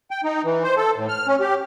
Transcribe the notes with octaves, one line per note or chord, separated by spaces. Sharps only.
G5
D#4
E3
C5
A4
A2
F6
C#4
G4